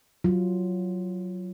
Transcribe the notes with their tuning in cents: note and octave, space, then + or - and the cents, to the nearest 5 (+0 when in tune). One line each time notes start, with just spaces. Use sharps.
F#3 +0 F4 -5